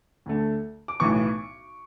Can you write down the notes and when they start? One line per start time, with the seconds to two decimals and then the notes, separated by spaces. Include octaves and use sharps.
0.26 D2 D3 A3
0.88 D6
1.00 B1 A2 E3 B3 C#6